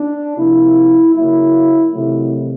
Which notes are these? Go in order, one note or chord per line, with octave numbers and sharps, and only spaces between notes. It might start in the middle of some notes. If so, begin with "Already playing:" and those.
Already playing: D4
C3 F3 A#3 E4
C#3 F#3 A#3 E4
C3 D#3 F#3 A3 E4